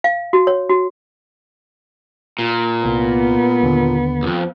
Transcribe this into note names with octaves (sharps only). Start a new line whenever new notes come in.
F5
F#4
C#5
F#4
A#2
C2 B3
D#2 D3
B1 F2